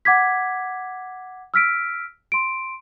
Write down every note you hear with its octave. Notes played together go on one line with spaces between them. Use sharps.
F#5 D6 G#6 B6
E6 F6 B6 D7
C6 D7